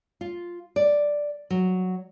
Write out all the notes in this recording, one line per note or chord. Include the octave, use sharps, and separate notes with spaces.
F4
D5
F#3